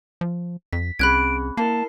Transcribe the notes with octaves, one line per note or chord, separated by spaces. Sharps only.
F3
F2 B6
C2 C4 C#4 G#4 B5 F#6 G#6 D7
A#3 E4 A#4 A5 C7